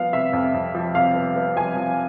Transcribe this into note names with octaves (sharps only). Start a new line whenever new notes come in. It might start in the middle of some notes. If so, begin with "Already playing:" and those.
Already playing: F3 B3 F5
C3 E5
F2
F2
F3
C3 F5
B3
B3
F3 G#5
F3